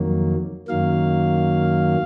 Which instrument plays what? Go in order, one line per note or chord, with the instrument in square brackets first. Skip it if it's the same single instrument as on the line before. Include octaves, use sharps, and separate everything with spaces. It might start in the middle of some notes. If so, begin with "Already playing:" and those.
Already playing: [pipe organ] F2 D#3 F#3 A#3
F#2 D#3 F#3 A#3 F5